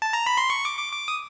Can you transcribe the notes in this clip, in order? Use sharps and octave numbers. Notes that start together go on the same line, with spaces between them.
A5
A#5
B5
C6
C#6
D6
D6
D6
D#6